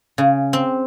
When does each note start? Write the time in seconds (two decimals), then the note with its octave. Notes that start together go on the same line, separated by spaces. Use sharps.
0.18 C#3
0.53 C4